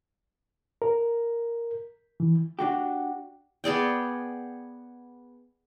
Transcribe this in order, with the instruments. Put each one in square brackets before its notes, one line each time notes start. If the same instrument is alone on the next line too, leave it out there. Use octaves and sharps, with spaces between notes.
[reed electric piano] A#4
E3
[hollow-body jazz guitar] D4 F#4 G4
[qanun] B3 G#4 D5 G5